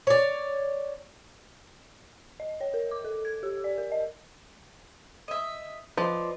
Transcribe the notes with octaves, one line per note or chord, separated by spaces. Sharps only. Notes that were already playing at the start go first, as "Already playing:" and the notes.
C#5 D5
D#5
C#5
A#4
D6
A4
G#6
G4
D5
A#4
D#5
D#5 E5
F3 B4 D5 D#5 C6